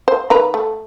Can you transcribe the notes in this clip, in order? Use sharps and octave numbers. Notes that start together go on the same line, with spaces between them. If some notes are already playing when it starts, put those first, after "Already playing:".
C5
D#3 B4 A#5
A3